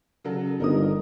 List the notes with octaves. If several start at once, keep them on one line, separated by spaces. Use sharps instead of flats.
C#3 F#3 A4
G1 D#4 A#4 D#6